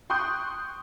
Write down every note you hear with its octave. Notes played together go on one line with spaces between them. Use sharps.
G5 C6 C#6 D#6 F#6 G6